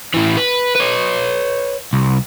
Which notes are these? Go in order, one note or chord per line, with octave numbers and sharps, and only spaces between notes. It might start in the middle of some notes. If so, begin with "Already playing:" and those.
A2 E3
B4
B4 C#5
C2